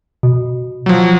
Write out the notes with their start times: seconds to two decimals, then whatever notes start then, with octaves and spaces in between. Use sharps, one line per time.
0.23 B2
0.86 F3 F#3